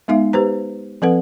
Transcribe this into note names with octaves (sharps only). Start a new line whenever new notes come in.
G#3 B3 D#4 E5 F5
G4 B4 C5 A#5
F3 C4 A4 B4 F#5